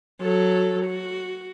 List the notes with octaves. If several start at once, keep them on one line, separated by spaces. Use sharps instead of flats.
F#3 A4
F#4